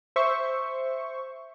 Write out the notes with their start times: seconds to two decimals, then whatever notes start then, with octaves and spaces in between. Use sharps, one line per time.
0.16 C5 E5 C#6